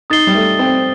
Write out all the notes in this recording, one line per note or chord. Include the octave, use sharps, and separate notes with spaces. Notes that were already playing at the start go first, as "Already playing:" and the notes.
D#4 D#6 A6 C7 G7
G3
A3
C4